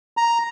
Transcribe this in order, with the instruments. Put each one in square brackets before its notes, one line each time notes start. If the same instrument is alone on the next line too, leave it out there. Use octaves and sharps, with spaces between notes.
[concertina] A#5